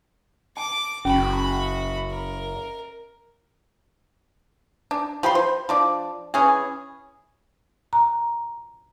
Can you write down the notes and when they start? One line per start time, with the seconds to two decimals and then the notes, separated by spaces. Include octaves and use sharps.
0.57 A5 D6
1.05 F#1 C#4 F#4 B5
2.11 A#4
4.91 D4
5.23 F3 G4 B5 C6
5.35 C5
5.69 F3 D4 D5
6.34 E3 C#4 G#4
7.93 A#5